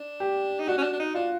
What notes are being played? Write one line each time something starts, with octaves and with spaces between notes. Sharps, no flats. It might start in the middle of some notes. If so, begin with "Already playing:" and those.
Already playing: D4
G4
D#4
D4 F#4
C#4
D4
D4
D#4
D4 F4